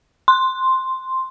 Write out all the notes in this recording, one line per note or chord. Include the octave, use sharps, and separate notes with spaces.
C6